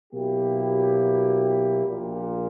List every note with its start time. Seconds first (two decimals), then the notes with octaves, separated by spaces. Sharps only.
0.12 B2 F#3 A#3 E4 G4
1.86 A#1 A#2 A#3